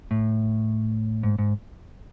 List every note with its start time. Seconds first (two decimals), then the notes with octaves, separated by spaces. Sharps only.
0.11 A2
1.23 G#2
1.38 G#2